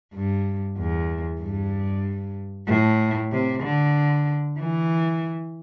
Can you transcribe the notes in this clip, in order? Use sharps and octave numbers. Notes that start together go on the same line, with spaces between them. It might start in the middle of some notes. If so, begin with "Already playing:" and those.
G2
E2
G2
A2
C3
D3
E3